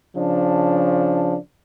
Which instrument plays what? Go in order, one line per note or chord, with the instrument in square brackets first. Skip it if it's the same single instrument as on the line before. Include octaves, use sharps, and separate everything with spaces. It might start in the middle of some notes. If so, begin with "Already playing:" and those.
[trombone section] C#3 F3 D4